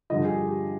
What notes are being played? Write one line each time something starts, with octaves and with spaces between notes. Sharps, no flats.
G2 D3 F3 D#5
G#4
G4
G4